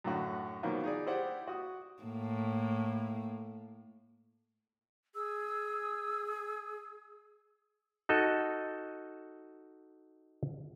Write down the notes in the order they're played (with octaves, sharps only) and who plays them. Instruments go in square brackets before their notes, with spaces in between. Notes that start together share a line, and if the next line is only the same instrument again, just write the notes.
[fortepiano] F#2 A2 D3 F#4
B2 D#3 F3 F#3 A#3
D#4 G#4 D5
E4 G4 C5 D5 F#5
F#4 D#6
[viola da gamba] A2 A#3
[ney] G#4 [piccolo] E6
[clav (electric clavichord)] D#4 F#4 A4 D#5